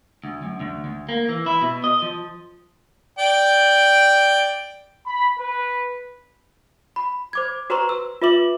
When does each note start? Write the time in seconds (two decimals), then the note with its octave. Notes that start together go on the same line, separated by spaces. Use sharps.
0.24 D2
0.43 F#2
0.60 D2
0.85 D2
1.09 A#3
1.29 E3
1.46 E4
1.62 B2
1.84 D#5
2.02 F3
3.19 D5 G5
5.06 B5
5.38 B4
6.96 B5
7.33 C5 D6 G#6
7.70 F#4 B4 C5 A#5 C6 C#6
7.89 E6
8.22 F4 B4 E5 D6 F#7